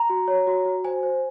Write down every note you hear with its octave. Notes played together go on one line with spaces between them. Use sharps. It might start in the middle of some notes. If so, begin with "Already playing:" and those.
Already playing: A#5
F#4
C#5
F#4
F#4
C5 G#5
C5